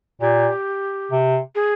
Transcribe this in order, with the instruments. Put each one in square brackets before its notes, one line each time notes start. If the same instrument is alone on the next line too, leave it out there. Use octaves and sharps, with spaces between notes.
[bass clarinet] A#2 [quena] G4
[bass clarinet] C3
[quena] G#4